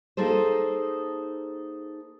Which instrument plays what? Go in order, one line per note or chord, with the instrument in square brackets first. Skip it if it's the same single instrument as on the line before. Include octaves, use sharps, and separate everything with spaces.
[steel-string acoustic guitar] A#3 D#4 G#4 A4 C5